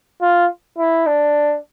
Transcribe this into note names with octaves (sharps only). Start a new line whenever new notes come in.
F4
E4
D4